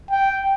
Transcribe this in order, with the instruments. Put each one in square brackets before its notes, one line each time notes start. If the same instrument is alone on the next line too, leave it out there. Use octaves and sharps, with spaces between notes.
[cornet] G5